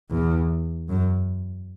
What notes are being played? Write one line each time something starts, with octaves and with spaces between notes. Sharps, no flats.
E2
F#2